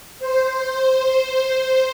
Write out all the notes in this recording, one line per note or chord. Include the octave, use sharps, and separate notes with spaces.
C5
C5